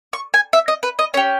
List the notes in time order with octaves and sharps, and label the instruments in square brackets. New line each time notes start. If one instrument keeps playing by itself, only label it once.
[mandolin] C#6
G#5
E5
D#5
B4
D#5
C#4 C#5
G4